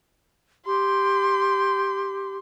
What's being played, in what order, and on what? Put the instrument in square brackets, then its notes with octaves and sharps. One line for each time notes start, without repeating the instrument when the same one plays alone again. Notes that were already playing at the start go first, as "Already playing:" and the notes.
[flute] G4 [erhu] C6